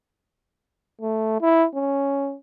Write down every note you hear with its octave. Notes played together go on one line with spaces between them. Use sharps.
A3
E4
C#4